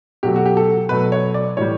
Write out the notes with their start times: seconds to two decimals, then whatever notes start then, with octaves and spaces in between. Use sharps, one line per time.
0.23 B2 F#3 A3 G4
0.36 F#4
0.46 G4
0.57 A4
0.89 B2 F#3 A3 B4
1.12 C#5
1.34 D5
1.57 A2 E3 G3 C#5